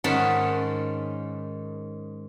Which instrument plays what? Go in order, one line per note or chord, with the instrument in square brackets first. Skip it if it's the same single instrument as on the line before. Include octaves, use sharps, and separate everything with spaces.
[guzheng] G#2 D#3 C#4 F#5 A5 B5